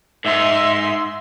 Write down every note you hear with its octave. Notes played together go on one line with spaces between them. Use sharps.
G#2 D#4 E5 C6